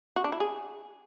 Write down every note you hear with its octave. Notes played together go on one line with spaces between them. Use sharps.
F#4
D4
E4
G#4